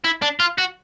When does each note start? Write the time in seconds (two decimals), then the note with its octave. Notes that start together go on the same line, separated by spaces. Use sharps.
0.04 E4
0.22 D4
0.40 F4
0.58 F#4